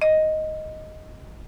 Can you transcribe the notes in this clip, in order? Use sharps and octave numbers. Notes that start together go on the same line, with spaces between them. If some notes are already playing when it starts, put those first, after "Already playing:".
D#5